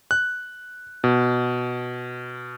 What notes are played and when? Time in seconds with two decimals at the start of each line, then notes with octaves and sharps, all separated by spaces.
0.11 F#6
1.04 B2